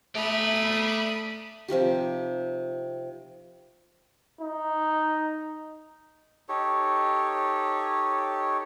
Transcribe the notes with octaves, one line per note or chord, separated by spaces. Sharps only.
A3 D5 A#5 B5 D#6
C3 F3 D#4 G4
D#4
D#4 G4 A4 C#5